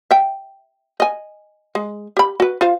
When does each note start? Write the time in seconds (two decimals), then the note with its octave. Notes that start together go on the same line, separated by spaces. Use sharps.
0.11 E5 G5
1.00 D#5 G#5
1.75 G#3
2.17 G4 B5
2.40 F#4 B4
2.61 F4 C5 F5